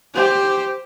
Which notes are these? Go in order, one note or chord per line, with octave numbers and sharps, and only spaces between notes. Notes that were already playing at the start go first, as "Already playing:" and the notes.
G4 C5